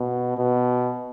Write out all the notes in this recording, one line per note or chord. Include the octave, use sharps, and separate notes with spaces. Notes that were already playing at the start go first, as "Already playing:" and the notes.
Already playing: B2
B2